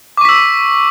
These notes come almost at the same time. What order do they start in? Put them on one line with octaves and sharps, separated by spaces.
D6 C#6 B6 E6